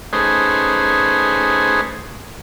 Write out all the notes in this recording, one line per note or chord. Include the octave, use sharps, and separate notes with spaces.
A3 C#4 D#4 G#4 B4 C5